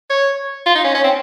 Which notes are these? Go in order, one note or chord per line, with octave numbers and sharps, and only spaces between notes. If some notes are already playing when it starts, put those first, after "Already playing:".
C#5
F4
D#4
C#4
C#4
C4